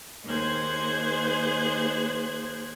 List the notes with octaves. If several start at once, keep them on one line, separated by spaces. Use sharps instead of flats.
D#2 G#4 C5 F#6 G#6